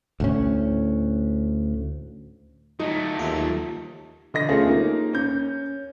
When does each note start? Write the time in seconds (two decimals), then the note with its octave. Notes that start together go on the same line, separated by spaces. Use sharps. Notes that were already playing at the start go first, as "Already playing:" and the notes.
0.20 D2 A2 C#4
2.79 F#3 A3 D#4
3.19 D#2 F4 E5
4.34 D3 D#5 A#6
4.49 A3 C#4 F4 G#4
4.67 A#3 D#4
5.13 C#4 G6